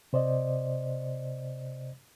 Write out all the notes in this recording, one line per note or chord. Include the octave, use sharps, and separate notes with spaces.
C3 C5 D5 D#5